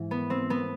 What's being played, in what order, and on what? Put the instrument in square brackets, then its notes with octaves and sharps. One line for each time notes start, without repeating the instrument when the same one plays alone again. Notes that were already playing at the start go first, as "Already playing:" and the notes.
Already playing: [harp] G#2 E3
B3
C4
B3